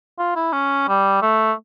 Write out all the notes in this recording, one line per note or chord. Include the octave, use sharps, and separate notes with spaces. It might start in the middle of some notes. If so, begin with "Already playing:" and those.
F4
E4
C#4
G3
A3